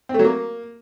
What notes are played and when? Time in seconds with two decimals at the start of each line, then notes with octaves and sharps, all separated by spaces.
0.09 C4
0.14 A3
0.19 F#3
0.24 A#3